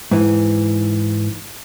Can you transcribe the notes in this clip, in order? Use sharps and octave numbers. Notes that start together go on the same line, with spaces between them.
G#2 E3